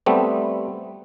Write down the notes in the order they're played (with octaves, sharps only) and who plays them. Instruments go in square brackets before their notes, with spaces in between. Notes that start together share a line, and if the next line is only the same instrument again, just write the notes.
[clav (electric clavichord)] G3 A3 B3 C4